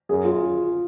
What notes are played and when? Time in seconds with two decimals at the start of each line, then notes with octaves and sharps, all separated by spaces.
0.09 F#2 G#4
0.24 F4